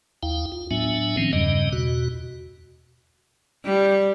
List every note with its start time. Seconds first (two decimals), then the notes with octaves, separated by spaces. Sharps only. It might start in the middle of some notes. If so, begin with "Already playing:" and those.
0.23 D#2 E4 F5 G5
0.52 F4
0.71 A2 F#3 B3 D4 E5 G#5
1.17 D#3 F3 C4 C#4
1.33 E2 G2 C#3 G3 D#5
1.73 E2 B2 F#4
3.65 G3